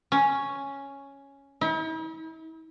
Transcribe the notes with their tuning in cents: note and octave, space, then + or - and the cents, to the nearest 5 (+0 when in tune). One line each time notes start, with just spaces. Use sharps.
C#4 +0
E4 -45